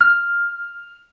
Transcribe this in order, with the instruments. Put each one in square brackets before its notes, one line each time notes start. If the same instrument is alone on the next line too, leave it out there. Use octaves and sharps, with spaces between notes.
[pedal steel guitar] F6